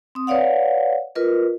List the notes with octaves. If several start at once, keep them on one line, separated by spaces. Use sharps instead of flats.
C4 D#6
B4 C#5 D5 F5 F#5
F4 A#4 B4 D#5